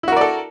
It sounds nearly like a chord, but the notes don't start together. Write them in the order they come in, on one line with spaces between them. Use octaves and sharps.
E4 F#4 A#4 D5 A4